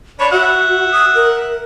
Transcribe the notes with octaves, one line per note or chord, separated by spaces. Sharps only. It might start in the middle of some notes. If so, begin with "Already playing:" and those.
D4 C#5 B5
F#4 E5 F#5
D#6
A#4